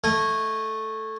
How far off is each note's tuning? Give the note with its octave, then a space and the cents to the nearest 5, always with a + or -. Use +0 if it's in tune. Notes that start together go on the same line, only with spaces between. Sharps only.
A3 +0 D#5 +15 G#5 -25